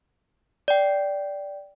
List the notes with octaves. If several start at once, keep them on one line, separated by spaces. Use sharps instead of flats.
D5 G5